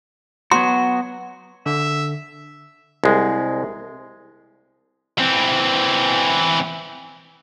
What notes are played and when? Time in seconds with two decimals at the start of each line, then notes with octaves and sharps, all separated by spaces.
0.51 F#3 B3 F#4 C6
1.66 D3 E5
3.04 C2 G#3
5.19 E3 C4